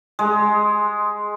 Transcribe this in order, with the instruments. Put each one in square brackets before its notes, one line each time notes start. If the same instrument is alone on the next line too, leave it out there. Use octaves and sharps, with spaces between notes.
[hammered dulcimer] G#3